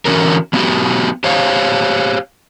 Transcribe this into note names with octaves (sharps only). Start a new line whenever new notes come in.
D3 E3 A3 C#4 F#4 A#4
F#3 B3 C#4 E4 F#4 G4
G4 C5 C#5 F5